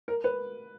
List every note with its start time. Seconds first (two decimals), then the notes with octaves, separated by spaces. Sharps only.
0.08 A#4
0.24 B4